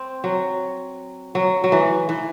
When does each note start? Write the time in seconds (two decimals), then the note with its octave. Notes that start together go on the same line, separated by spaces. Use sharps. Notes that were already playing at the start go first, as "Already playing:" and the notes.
Already playing: C4
0.24 F#3
1.35 F#3
1.64 F#3
1.72 E3
2.09 E3